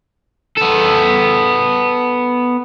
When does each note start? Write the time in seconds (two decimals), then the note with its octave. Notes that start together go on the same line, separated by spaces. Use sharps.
0.57 B3 A4